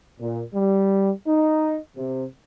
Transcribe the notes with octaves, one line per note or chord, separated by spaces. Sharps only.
A#2
G3
D#4
C3